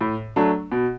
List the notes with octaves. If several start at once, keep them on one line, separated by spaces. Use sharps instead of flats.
A2
F#3 A3 D4
B2